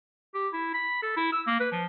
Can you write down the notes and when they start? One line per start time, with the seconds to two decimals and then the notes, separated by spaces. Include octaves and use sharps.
0.34 G4
0.53 E4
0.74 B5
1.02 A4
1.17 E4
1.32 E6
1.47 A#3
1.60 B4
1.72 F3